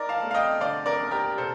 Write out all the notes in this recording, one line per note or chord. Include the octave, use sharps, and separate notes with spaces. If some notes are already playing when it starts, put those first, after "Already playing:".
Already playing: D#4 A#4 D5
F5 A5
A3
F5
D#5 G5
D3 D5 F5
A#4 D5
D#2
G4 A#4
C3 A4 C5